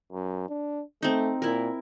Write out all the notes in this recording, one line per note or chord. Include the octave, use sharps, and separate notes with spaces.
F#2
D4
A3 C4 D#4
A#2 E4 A#4